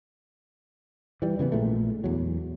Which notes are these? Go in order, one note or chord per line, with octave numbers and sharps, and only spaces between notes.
E3 G3
C#3 E3 A#3 B3
A#1 A#2 G#3 A3
E2 F#3